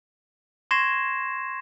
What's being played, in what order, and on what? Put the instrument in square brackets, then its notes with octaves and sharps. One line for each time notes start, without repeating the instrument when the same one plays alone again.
[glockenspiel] C6 C#6 G#6 A#6 C7 E7